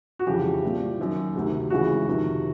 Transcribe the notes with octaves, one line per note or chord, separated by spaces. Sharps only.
F#4
F2 C#3 E3 G4
C2 A#2
F#2 D#3
D2 C3 D#3
C#2 C#3 E3 F#4
F2 C3 D#3